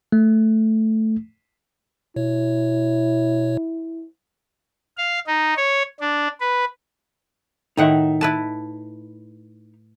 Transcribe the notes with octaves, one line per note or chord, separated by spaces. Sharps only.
A3
B2 E4 C#5
F5
D#4
C#5
D4
B4
A2 D#3 D#4 E5 F#5
E4 B4 A5